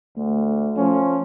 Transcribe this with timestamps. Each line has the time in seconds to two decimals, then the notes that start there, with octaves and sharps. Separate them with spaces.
0.17 D2 A3
0.78 F3 C#4